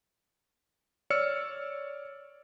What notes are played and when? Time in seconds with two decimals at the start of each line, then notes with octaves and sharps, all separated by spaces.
1.10 C#5 D5 E6 F6 C#7